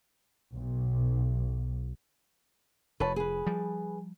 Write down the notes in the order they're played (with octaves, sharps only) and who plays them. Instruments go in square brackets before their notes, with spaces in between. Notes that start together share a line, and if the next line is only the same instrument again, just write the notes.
[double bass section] B1
[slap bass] F1 [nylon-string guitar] B4 C#5 A5
[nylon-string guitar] G#4 B4
[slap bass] F3 G3